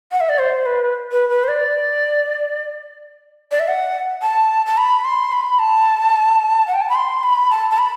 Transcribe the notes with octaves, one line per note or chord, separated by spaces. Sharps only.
F#5
E5
D5
C5
B4
B4
B4
C5
D5
D5
E5
F#5
A5
A5
B5
C6
B5
A5
F#5
G5
A5
B5
C6
B5
A5
A5
B5